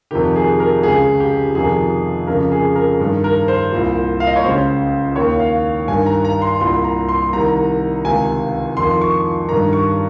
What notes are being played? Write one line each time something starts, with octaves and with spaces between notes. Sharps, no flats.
F2 C3 D#3 G4
G#4
A#4
C#2 C#3 G#4
G4
F2 C3 D#3 G#4
F2 C#3 A#4
G#4
A#4
G2 D#3
A#4
C5
C2 A#2
F5
D#5
C#5
C#2 C#3 C5
D#2 D#3 C#5
F5
G2 D#3 G#5
A#5
A#5
C6
C2 A#2 C6
A#5
C6
C2 C3 D#3 A#5
C#2 C3 D#3 G#5
F2 D#3 C6
C#6
G2 D#3 A#5
C#6